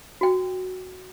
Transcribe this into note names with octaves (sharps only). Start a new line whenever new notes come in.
F#4 G5